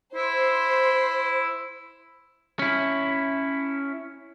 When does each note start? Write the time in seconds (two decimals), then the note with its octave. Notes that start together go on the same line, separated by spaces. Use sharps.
0.15 E4 C5
2.59 C#4 E4